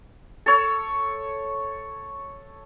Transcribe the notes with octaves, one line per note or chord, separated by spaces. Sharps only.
A4 C#5